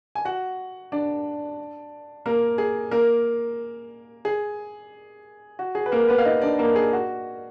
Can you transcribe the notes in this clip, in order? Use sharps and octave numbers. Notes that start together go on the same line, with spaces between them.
G#5
F#4 F#5
D4 D5
A#3 A#4
G#4
A#3 A#4
G#4
F#4
G#4
B4
A#3 A#4
B3 B4
F5
D#4 D#5
D4 D5
A#3 A#4
G#4
F#4